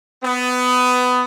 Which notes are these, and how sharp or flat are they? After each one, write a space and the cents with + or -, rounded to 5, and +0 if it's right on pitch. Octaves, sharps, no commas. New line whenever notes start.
B3 +20